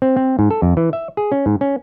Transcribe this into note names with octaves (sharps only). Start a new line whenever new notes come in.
C4
C4
G#2
A4
F2
E3
E5
G#4
C#4
G#2
C#4